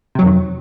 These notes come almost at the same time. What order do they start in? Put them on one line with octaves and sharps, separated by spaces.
C3 F#3 F2 D#3